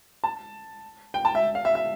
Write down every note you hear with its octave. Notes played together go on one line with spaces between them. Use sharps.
A5
G5
A5
E5
F5
E5
E5